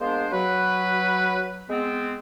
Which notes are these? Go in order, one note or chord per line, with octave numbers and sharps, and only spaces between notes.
G#3 A#3 B3 D4 C5
F#3 B4
G#3 B3 C4